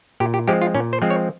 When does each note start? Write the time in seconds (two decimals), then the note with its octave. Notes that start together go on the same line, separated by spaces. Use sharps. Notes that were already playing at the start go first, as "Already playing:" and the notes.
0.20 A#2 G4
0.34 G4
0.48 F3 G#3 C4 G4
0.62 F4
0.74 A#2 C#4
0.93 C5
1.02 F3 G#3 C4
1.10 C#5